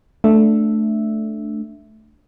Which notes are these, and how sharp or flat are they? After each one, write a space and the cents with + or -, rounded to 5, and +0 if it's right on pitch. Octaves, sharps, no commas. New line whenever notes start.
A3 -5 D4 +0 E5 +0